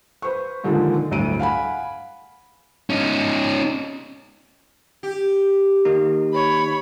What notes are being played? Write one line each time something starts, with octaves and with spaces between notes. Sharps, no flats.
B4 C5 C#6
A#2 D3 D#3 F3 G#3 A#3
G1 D2 A2 F#3 D7 D#7
F5 F#5 G#5 B5
C#4 D#4
G4
D#3 A#3 D#4
C#5 B5